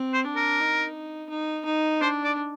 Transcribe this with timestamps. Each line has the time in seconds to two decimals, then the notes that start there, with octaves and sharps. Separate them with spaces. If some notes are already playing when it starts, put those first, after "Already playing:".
Already playing: C4
0.14 C5
0.25 D4
0.36 A#4
0.59 D#4
1.30 D#4
1.65 D#4
2.01 D4 C5
2.24 D5